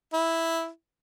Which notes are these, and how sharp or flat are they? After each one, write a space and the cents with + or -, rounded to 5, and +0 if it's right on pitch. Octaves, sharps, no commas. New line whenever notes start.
E4 -5